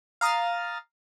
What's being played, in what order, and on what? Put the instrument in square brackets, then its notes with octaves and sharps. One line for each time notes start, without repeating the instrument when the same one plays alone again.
[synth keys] F5 A#5 D#6 F6 A6